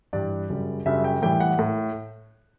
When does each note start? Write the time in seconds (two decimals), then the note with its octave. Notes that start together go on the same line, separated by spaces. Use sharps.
0.13 G2 E3 G3 D5
0.50 F#2 C#3 G3
0.86 F#2 C#3 G3 E5
1.04 G5
1.22 A2 E3 G3 G5
1.40 F#5
1.59 A2